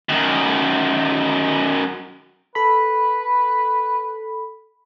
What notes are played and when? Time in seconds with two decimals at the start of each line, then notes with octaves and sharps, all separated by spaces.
0.09 F#2 D#3
2.55 A4 B4 B5